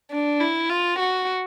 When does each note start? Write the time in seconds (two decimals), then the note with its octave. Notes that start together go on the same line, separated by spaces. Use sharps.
0.11 D4
0.40 E4
0.70 F4
0.99 F#4